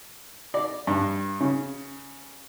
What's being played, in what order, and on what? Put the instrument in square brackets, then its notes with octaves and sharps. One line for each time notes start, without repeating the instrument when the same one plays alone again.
[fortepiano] D5
G2
C#3